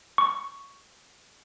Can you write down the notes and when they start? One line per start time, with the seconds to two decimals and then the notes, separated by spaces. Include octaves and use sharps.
0.18 C#6